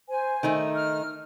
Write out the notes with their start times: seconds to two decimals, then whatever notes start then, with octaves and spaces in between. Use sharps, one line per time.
0.09 C5 G#5
0.43 D#3 A3 D#4
0.75 F6